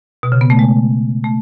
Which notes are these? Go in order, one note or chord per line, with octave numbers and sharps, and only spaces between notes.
B2
C#3
B3
A3
G#3
A3